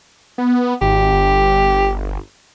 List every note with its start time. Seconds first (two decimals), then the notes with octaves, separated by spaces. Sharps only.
0.38 B3
0.81 G#1 G4
1.13 G1